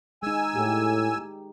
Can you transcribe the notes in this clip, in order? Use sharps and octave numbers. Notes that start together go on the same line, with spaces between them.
G#3 D#4 G#5 E6
A2 G4